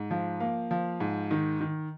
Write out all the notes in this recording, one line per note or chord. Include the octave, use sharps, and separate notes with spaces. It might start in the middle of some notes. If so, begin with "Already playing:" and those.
Already playing: G#2
F3
A#3
F3
G#2
D#3
D#3